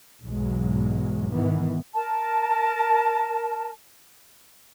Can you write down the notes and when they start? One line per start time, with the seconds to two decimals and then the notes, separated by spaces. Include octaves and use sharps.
0.23 B1 E2 G#2 F#3 G#3
1.30 G#2 D#3 E3 B3
1.94 A#4 A5